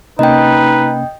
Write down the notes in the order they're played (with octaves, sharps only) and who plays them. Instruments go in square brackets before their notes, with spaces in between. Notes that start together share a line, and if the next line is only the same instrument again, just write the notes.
[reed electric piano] C3 A#3 C#4 [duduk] D#4 [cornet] B4 [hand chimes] D#5 G5